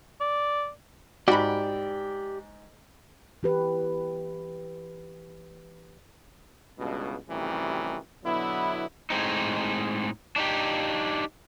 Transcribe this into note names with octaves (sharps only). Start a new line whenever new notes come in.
D5
G#2 F#4 G4 D5 B5
E3 G4 B4
C#2 G2 B2
F#2 A2 C3 D#3 E3 G3
B2 D3 F#3 B3 E4
A2 G#3 C4 D#4
D4 D#4 G4